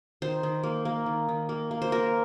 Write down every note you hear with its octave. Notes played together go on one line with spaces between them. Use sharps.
D#3 C5
D#3
A#3
A#3
D#3
D#3
A#3
A#3
C5
A#3 A#4